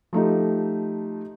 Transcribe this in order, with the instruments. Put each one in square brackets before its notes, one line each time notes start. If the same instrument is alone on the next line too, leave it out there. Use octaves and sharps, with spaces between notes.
[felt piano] F3 A3 D#4 G4